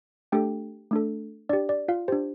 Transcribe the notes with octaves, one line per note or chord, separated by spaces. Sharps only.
A3 D4 G4 A4 G5
A3 D4 A4
D4 G4 D5
D5
F4 F5
D4 G4 C5